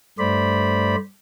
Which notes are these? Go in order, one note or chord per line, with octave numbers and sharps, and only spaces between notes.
G2 A3 C5 D5 B5